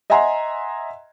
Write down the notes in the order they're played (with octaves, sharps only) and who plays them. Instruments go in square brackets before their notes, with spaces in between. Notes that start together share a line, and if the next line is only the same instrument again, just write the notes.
[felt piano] D#5 E5 F#5 G#5 A#5 C6